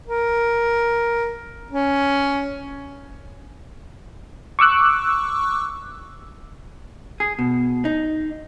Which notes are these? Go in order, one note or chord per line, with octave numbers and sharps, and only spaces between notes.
A#4
C#4
C#6 D6 E6 F#6
G#4
B2
D#4